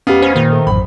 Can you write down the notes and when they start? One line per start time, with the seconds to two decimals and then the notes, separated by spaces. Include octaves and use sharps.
0.07 F1 B3 C#4 G4 F5
0.22 C#4 C5
0.36 A#2 D#3
0.52 A3
0.67 A1 F#2 B5